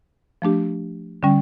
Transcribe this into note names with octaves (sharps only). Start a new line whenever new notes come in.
F3 A3 D4 G4
D3 G3 C#4